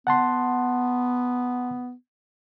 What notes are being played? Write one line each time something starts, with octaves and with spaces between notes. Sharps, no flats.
B3 F#5 A5 C6